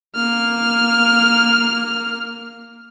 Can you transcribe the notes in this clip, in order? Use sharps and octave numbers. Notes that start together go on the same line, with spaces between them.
A#3 F6